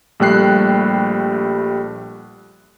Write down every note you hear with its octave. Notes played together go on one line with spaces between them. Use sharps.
A#1 G3 A3 G5 F#6 C7